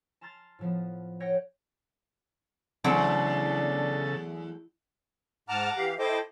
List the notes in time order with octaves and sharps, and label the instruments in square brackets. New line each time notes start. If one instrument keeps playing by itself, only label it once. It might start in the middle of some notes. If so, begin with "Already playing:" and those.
[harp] A5 A#5 C6 F6 A6
A2 F3 B3
C#5 F#5 G5 G6 A#6 C#7
[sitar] E2 [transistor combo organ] C#3 A4 [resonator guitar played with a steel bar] F#3 A3 C4 [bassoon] D4
[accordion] G#2 A5 F6 [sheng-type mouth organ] F#5 A#5 D6
[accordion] E3 G4 F5
[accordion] E4 C5 D#5 [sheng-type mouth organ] A4 G5 D6